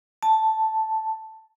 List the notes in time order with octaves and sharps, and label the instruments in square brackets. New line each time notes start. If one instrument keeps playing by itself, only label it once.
[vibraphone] A5